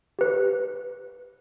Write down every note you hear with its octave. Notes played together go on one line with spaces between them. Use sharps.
G4 B4